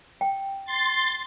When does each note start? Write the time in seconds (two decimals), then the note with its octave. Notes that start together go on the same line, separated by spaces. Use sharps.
0.21 G5
0.65 C6 A6